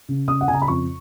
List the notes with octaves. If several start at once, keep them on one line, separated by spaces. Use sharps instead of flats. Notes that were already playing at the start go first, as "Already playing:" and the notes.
C#3
C#3 D#6
F#5
C#3 G#5
A#5
B5
F2 C#6